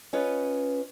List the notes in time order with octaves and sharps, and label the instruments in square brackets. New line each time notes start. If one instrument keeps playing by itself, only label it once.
[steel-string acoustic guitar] C#4 F4 B4 C#5 D#5